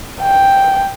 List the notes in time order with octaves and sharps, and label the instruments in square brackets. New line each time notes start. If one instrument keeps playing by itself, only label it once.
[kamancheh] G5